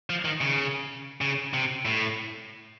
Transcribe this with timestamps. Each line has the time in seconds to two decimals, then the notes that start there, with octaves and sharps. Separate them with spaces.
0.10 F3
0.25 D#3
0.41 C#3
1.21 C#3
1.54 C3
1.85 A2